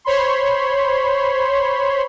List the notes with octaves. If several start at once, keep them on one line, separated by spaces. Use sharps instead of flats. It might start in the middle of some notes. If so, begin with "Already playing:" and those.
C5 C#5 B5 C6